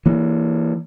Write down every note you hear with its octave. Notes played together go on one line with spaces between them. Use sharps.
E3 A#3